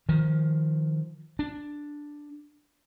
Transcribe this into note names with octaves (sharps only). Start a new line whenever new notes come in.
D#3 F3
D4